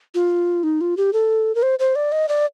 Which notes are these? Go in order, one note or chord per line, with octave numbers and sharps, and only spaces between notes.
F4
D#4
F4
G4
A4
A#4
C5
C5
D5
D#5
D5